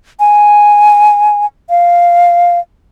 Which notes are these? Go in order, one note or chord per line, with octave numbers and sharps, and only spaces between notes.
G#5
F5